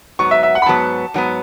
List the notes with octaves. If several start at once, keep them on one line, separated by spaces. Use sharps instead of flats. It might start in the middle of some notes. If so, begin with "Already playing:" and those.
G#2 F#3 B3 C#6
E5
E5
F#5
B5
G#2 F#3 B3 A5
G#2 F#3 B3